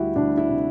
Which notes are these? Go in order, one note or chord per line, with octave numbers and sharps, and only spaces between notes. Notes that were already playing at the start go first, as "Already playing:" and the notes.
Already playing: D2 G3 E4 F#4 G4
D2 D4
E4
C3